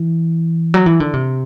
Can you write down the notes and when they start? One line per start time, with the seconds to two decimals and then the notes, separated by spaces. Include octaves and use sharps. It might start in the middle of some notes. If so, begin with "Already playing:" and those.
Already playing: E3
0.74 F#3
0.86 E3
1.00 D3
1.13 C3